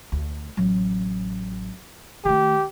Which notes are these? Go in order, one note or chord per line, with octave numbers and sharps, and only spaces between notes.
D2
A1 F#3
D#3 A3 G4